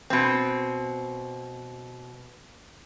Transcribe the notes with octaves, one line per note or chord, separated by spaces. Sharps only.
B2 C4